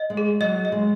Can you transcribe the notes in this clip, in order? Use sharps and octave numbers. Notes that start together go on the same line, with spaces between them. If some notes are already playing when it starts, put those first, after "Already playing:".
Already playing: D#5
G#3
G#4
F#3 D#5
D#5
G#3